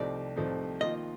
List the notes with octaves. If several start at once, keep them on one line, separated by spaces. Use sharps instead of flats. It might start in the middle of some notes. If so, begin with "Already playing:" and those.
Already playing: C2 C3 F3 A3 D#4 D5
C2 C3 F3 A3 D#4
D#3 A#3 F4 D#5